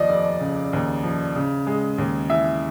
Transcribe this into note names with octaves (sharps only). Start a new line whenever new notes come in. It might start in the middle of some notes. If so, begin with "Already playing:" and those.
Already playing: D#2 F3 D5 D#5
F1
C#3
D#2
F3
C#3
G#3
D#2
E3 E5